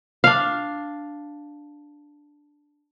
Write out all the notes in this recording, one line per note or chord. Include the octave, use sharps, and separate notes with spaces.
D4 F5